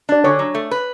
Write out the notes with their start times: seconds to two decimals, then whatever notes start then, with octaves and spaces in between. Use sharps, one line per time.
0.09 D4 D5
0.24 D3 C#5
0.39 F#3
0.55 A3
0.71 B4